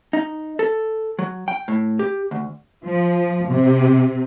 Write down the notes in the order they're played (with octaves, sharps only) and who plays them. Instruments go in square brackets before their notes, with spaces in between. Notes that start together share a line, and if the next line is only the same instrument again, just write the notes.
[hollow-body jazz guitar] D#4
A4
F#3
G5
A2
G4
D2
[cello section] F3
C3